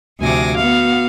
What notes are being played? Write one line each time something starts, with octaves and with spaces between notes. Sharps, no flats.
D2 C3 F3 G#5 D6 A#6
B3 F#4 F5